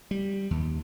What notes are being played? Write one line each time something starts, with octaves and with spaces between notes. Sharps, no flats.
G3
D#2